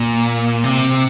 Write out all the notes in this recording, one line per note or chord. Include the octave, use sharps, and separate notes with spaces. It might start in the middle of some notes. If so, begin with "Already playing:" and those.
Already playing: A#2
C3